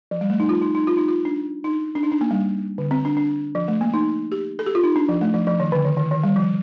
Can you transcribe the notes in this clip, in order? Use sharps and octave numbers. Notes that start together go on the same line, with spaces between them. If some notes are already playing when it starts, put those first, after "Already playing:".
F3
G3
A3
D#4
F4
D#4
D#4
F4
D#4
F4
D4
D#4
D4
D#4
D4
A#3
G3
D3
C4
D4
D4
F3
A3
A#3
D#4
G4
A4
G4
F4
D#4
D4
F3
A3
F3
F3
D#3
D3
D#3
D#3
D#3
G3
F3